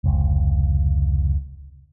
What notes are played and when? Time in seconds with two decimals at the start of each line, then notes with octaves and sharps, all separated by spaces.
0.04 F1 C#2